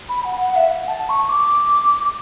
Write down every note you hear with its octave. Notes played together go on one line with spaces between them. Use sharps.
B5
F#5
F#5
E5
F#5
A5
C#6
D6